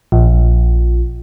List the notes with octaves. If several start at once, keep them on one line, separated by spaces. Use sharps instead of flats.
A#1